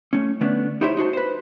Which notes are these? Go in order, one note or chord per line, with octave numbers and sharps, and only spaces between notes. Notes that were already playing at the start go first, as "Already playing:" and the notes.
A3 C#4
D3 A3 B3 C#4 D4
D#4 E4 G4 C5 C#5 E5
D#4 F#4 C5 A5
B4 C5